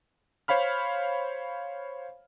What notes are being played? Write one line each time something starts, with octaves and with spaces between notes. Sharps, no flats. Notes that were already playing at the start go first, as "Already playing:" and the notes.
C5 C#5 F5 B5 F6